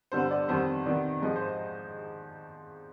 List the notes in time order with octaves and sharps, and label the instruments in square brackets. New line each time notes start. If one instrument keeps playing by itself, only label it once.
[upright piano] G2 D3 G3 B3 C5
D5
F2 D#3 G3 B3 C5
C3 D#3 B3 D5
G#2 F3 G#3 D#5
C5